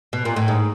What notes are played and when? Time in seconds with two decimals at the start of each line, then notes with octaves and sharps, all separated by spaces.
0.13 B2
0.25 A#2
0.36 A2
0.48 G#2